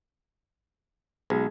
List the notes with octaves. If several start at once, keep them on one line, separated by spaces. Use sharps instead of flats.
B1 G#3